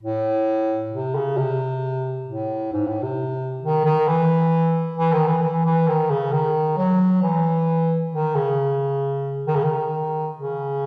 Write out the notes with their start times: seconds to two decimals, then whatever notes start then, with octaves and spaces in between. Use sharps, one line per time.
0.03 A2
0.93 C3
1.15 C#3
1.37 C3
2.28 A2
2.72 G#2
2.87 A2
3.03 C3
3.63 D#3
3.85 D#3
4.08 E3
4.97 E3
5.12 D#3
5.27 E3
5.43 E3
5.65 E3
5.87 D#3
6.10 C#3
6.32 D#3
6.77 F#3
7.23 E3
8.13 D#3
8.35 C#3
9.47 D#3
9.56 C#3
9.64 D#3
10.37 C#3